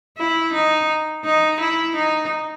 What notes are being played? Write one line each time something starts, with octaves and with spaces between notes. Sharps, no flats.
E4
D#4
D#4
E4
D#4